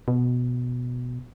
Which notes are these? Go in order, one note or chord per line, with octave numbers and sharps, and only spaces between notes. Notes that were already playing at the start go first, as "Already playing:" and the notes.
B2